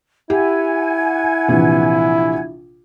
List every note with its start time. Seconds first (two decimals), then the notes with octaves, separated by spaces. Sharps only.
0.30 E4 G4 F#5 G#5 G#6
1.48 A#1 C3 E3